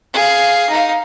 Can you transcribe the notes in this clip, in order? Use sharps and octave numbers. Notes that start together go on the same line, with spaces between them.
G#4 F5
D#4 F5